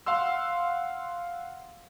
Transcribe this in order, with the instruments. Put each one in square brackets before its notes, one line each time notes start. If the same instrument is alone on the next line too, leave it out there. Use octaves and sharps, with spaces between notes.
[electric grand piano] F5 F#5 C6 E6